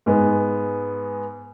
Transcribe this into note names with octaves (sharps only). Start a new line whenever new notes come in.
G#2 G#3 B3